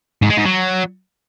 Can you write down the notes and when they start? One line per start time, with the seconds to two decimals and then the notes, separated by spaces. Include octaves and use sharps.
0.22 G#2
0.30 G#3
0.38 G#2
0.45 F#3